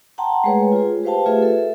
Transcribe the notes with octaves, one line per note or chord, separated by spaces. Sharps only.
F#5 G5 A5 A#5 C6
G#3 A3 G#4 B4 C#5
F4 G#4
G4 B4 C5 F5 G5 A5
A3 F4 G4 G#4 B4 E5
A4 E5